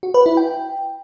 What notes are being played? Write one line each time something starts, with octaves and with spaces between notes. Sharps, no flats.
F#4
B4
E4
G5